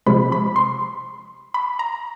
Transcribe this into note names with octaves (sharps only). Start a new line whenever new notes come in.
C3 F3 G#3 B5
B5
C6
B5
A#5